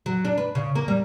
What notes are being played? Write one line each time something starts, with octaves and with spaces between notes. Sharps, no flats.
F#3
D4
B4
C#3
A#3
G3